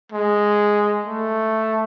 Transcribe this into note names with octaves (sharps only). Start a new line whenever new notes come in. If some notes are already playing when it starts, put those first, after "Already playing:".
G#3
A3